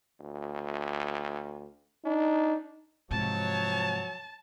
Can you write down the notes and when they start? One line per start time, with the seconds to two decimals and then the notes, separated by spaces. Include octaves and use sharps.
0.20 D2
2.05 D4 D#4
3.11 G#2 C3 F3 F#3 C#5 A5